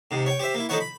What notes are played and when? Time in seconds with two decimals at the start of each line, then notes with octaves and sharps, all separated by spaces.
0.11 G#2 C3
0.26 C#5 G5
0.40 G4 C5 E5
0.54 A#3 E4
0.69 F3 A3 D#4 C5 C#5 F#5
0.80 B5